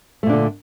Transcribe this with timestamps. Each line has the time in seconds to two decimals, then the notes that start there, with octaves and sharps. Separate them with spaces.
0.23 A3
0.26 A#2
0.29 D4
0.33 D3